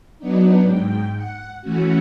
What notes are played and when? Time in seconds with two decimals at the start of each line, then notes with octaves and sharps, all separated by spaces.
0.19 F#3 B3 D4 D#4
0.63 G#2 G5
1.15 F#5
1.62 E3 A3 C#4 F#4